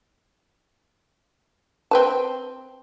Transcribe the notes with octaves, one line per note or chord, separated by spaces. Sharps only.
C4 B4 A5